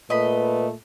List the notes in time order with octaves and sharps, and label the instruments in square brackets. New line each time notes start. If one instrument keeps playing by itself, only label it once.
[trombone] A#2 [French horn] A3 [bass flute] B4 [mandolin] D#5 B5